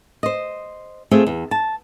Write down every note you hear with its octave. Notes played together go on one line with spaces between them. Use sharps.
C5 D#5
A3 C4 F4 G#4 A4
E2
A5